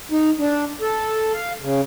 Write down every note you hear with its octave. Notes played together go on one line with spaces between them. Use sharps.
D#4
D4
A4
F5
C#3